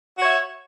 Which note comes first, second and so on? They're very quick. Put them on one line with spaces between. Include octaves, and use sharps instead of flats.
F#4 C#5 E5